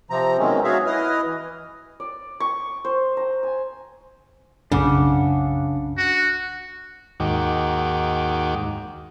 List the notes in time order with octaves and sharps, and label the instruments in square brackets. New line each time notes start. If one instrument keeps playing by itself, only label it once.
[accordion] C3 F3 C4 A#5
B2 D#3 F#3 G#3 C4 C#4
F#4 G#4 C#5 E5 F5
E4 B4 D#5 D#6 F6
E3
[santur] D5
C#6
C5
A#5
G#5
[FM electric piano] B1 F#2 [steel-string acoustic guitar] C#3 [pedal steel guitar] D4 F#5 D6
[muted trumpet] F#4
[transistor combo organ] D#2 G#2 D#3 F#4 G5 D6